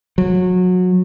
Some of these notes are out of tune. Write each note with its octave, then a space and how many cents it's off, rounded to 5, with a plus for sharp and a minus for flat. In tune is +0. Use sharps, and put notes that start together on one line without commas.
F#3 -25